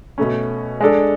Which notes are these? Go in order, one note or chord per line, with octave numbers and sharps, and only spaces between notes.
B2 A3 C#4
G#3 D4 A4